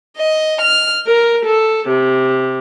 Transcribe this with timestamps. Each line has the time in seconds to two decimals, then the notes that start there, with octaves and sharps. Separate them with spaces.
0.17 D#5
0.61 F6
1.08 A#4
1.46 A4
1.88 C3